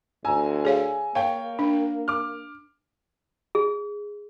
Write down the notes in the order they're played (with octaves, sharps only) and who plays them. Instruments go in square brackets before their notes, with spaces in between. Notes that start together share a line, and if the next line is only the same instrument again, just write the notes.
[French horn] D2 [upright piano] G#5 A#5 E6
[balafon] G#4 C#5 F5
[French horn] A#3 [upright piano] C#5 G5 [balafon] F5
[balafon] D4
[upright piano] D6 F6
[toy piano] G#4